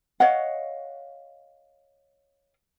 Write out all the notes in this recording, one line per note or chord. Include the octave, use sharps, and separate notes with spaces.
C#5 D#5 F5 F#5